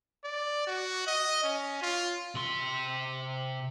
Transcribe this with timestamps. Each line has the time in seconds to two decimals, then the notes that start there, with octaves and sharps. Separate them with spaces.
0.24 D5
0.67 F#4
1.07 D#5
1.43 C#4
1.82 F4
2.35 C3 C6